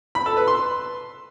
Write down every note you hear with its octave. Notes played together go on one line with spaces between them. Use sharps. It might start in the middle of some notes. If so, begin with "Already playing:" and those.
B5
A4
B4
C6